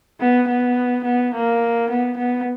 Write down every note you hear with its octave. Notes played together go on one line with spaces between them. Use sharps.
B3
B3
B3
A#3
B3
B3